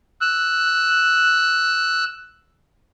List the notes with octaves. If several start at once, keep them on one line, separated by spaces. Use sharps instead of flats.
E6 F#6